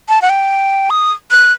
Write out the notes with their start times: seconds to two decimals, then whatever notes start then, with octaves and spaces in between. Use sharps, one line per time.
0.09 A5
0.22 F#5
0.29 G5
0.90 D#6
1.31 F#6